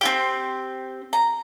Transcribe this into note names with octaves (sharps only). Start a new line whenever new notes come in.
C4 F4 G4
A#5